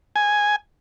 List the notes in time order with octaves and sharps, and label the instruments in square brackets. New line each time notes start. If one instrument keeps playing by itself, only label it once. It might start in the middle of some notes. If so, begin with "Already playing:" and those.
[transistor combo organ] G#5